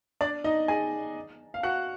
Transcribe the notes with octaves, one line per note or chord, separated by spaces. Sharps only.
D4 D5
D#4 D#5
G#4 G#5
F5
F#4 F#5